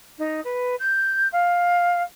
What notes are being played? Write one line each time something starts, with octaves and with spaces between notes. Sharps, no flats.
D#4
B4
G6
F5